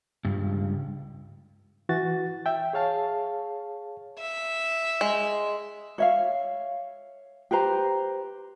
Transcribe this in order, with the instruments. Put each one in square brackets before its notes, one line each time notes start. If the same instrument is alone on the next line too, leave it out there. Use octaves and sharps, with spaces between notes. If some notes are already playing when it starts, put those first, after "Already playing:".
[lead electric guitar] C#2 G2
[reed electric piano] E3 F#4 A6
E5 G5
G#4 C#5 F5 A5
[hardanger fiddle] E5
[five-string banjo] G#3
[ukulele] C#5 E5 F5
G4 B4 C5 A#5